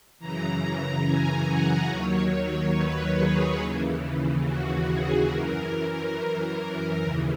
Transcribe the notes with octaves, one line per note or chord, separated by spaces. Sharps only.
F#2 C#3 E3 A#5
A#5
G#5
F#5
D#2 D#3 F#3 C#5
C#5
B4
G#4
D#2 C#3 E3
F#4
G#4
F#2 E3 A#4
D#2 C#3 E3